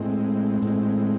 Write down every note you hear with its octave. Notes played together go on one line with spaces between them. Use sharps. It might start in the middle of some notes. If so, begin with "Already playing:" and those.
Already playing: A2 G#3 C4
A2 G#3 C4